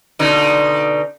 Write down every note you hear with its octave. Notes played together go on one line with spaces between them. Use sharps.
B2 D3 D#4